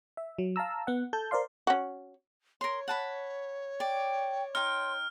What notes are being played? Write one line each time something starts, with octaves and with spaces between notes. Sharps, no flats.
E5
F#3
F5 A5 A#5 E6
B3 F#5
A4 A5 G6
A#4 C5 D5 F5 C6
C#4 F#4
A#4 C#5 C6
F#5 A5 B5
D5 G5
D#4 G5 C6 F6